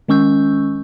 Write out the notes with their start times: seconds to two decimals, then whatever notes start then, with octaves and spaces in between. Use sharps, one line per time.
0.08 D#3 G#3 C#4 C#6 E6 G6